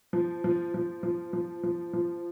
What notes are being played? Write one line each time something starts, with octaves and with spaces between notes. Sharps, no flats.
F3
F3
F3
F3
F3
F3
F3